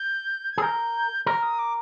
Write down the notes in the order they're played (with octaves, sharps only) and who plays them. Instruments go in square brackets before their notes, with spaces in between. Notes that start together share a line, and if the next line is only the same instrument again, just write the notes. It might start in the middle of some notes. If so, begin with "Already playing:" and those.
Already playing: [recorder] G6
G#6
[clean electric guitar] G#4
[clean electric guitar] A#4 [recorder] G6
[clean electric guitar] A#4 [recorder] F6
[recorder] D#6
D6